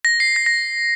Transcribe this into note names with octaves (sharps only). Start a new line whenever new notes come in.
A#6
C7
A#6
A#6